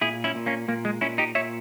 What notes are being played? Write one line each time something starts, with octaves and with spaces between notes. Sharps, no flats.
A#2 E4 G#4
C#4 E4
A#2
A#3 C#4
A#2 A#3
G#3
A#2 C#4 E4
D#4 G4
A#2 C#5 E5